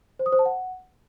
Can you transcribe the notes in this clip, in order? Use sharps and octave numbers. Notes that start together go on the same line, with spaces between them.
C5
D#6
C5
A5
F#5